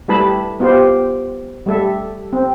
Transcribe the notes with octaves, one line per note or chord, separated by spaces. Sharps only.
G3 A3 E4 B4 A5 B5
B3 F4 G4 C5
G3 A3 A4 E5
C4